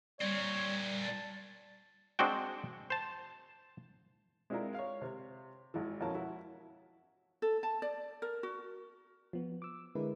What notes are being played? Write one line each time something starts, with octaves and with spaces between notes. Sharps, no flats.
A#2 G3 C4 C#5
A5
G#3 C4 D4 F#4 G5
C5 A5
G#3 C4 D4 E4 F4 A#4
C#5 F5
C3
G#1 E3
F2 B2 E3 C#4 A#4 A5
E4 F#4
A4
A5
D5
A#4
F#4
F3 B3
D6 E6
D3 G#3 E4 A#4 B4